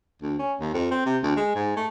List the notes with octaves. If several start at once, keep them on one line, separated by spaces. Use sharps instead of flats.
D2
C#4
D#2
F2
C4
C3
D2
G#3
G#2
A3